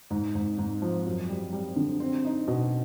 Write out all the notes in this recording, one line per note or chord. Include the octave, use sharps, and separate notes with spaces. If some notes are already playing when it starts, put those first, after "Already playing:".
G#2
G#2
G#2
F3
F#2
G3
G3
D3
C4
D#4
B2